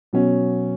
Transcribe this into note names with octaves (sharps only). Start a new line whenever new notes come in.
B2 F#3 C#4